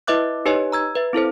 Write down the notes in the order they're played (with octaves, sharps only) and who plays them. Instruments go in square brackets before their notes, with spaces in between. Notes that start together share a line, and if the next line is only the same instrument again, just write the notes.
[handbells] E4 B4 D#5 E5 D6 F#6
D#4 G4 B4 C#5 D#5 G#5
A#5 E6 G#6
B4 E5
C4 E4 A4 C5